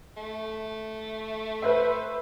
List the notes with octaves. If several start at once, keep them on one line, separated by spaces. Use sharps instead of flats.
A3
B4 C5 E5